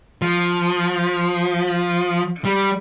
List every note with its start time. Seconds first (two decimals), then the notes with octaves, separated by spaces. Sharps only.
0.22 F3
2.45 G3